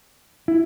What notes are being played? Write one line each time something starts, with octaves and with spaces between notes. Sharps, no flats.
E4